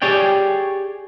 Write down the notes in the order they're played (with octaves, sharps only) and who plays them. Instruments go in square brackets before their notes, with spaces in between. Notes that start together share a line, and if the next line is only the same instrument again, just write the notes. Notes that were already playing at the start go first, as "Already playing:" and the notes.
[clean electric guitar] G4 G#4 C#5 D5 G5